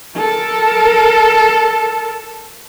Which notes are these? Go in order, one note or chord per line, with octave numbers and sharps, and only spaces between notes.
A4 A#4